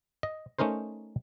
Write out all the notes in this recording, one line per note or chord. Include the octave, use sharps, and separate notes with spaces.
D#5
A3 C#4 D#4 A#4 C5